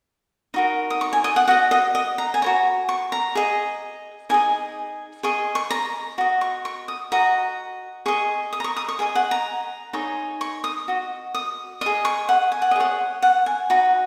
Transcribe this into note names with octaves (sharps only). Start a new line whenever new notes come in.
D#4 F#4 A#4
D#6
C#6
G#5
D#5
F#5
F#4 D#5 F#5
D#5
D#5
A#5
G#5
F#4 A#4 C#5 A#5
C#6
A#5
G#4 D#5
D#4 G#4 D#5 G#5
G#4 D#5 C#6
C#6
A#5
F#4 D#5
C#6
C#6
D#6
F#4 D#5 A#5
G#4 D#5 C#6
D#6
A#5
C#6
D#6
C#6
G#4 D#5 G#5
F#5
A#5
D#4 G#4 C#5
C#6
D#6
F#4 D#5
D#6
G#4 D#5 D#6
C#6
F#5
G#5
F#5
D#5
G#4 C#5 F#5
F#5
G#5
D#4 F#4